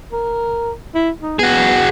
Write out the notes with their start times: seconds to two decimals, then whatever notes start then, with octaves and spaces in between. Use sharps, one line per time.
0.13 A#4
0.95 E4
1.21 D#4
1.39 B3 F#4 G#4